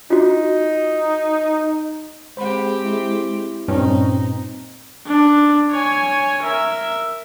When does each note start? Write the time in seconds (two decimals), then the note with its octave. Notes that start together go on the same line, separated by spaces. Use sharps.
0.10 D#4 F4 F#4
2.37 G#3 C4 G4 C5 B5
2.85 E4
3.68 G2 A#2 C4 C#4 D#4 B4
5.06 D4
5.71 C#5 G#5
6.42 A#4 E5